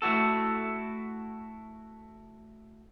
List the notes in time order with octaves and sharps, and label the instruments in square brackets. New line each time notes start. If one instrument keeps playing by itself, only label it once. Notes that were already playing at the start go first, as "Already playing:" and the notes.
[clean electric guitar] A3 E4 F#4 A4